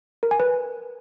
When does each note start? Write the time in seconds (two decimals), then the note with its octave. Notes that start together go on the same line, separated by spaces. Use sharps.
0.23 A#4
0.31 G#5
0.40 B4